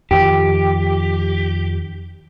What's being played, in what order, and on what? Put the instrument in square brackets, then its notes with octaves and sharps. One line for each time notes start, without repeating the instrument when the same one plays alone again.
[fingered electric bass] F2 D#3 F3 [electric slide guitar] G4